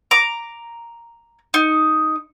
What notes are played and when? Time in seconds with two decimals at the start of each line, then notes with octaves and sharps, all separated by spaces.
0.11 A#5 D6
1.54 D#4